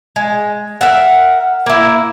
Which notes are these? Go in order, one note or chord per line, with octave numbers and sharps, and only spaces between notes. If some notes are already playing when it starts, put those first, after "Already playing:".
G#3
A#4 E5 F#5
A#3 E4